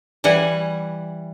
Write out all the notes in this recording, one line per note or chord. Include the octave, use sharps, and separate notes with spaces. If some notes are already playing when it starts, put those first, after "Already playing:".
E3 G3 F#5 G#5